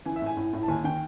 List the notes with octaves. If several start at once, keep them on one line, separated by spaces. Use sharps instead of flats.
E3 G#5
E5
A2 G#5
A2
A2
A5
D#2 G#5
D#3 G5